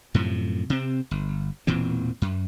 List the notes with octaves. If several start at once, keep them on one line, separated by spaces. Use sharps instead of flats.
F#2 A2 C3 F3
C3 C4
G1
E1 A#2 E3 C4
F#2